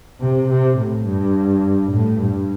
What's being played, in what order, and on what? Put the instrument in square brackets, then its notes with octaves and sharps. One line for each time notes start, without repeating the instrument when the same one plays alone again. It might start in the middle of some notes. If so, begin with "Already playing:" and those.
[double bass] C3
C3
A2
G2
A2
G2